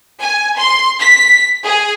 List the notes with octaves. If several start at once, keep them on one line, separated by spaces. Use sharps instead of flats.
G#5
C6
B6
G#4